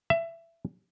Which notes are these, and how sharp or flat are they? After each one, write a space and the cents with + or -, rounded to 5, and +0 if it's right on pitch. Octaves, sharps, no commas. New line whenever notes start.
E5 +20